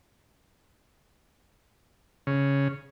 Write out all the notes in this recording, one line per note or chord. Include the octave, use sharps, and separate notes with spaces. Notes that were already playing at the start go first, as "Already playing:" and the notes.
C#3